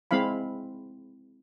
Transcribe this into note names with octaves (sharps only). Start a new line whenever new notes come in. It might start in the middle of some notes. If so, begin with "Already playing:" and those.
G#3 C4 E4 F5 B5